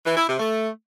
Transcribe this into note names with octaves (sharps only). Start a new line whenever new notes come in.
E3
E4
C3
A3